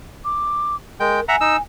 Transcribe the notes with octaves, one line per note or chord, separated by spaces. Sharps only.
D6
G#3 A#4 G5
E5 F#5 G#5 A#5
D#4 E6